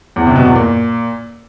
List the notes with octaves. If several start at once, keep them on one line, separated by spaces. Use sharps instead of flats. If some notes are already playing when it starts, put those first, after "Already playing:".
E2
C3
B2
E2
A#2